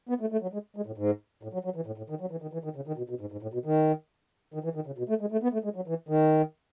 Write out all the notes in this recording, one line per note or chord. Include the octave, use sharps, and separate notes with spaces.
B3
A3
A3
F#3
G#3
G#3
A2
G#2
A2
F#3
F#3
E3
A2
A2
D#3
F#3
E3
D#3
E3
D#3
C#3
D#3
B2
B2
G#2
G#2
A2
B2
D#3
D#3
E3
D#3
C#3
B2
A3
G#3
A3
B3
A3
G#3
F#3
E3
D#3